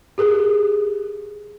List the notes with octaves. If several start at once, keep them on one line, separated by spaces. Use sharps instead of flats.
G4 G#4 A#4